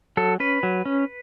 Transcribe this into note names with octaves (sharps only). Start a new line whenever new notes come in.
F#3 A4
C#4 B4
F#3
C#4